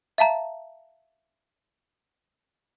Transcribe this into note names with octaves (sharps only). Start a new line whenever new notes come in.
E5 F5 A5 A#5